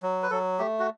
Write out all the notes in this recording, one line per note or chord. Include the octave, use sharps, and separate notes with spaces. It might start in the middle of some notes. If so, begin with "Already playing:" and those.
F#3
B4
F#3 A4
A3 G4
F#4